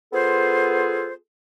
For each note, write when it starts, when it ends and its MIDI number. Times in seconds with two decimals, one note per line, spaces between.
0.13 1.12 59
0.13 1.12 65
0.13 1.12 68
0.13 1.12 69
0.13 1.12 72